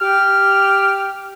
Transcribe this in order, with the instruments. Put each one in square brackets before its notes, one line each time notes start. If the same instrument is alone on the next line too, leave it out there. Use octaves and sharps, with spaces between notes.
[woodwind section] G4 F6